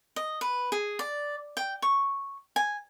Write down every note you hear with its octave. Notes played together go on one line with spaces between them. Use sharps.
D#5
B4
G#4
D5
G5
C#6
G#5